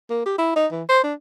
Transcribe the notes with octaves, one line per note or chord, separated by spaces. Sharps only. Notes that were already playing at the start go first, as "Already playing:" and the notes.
A#3
G4
E4
D#4
E3
C5
D4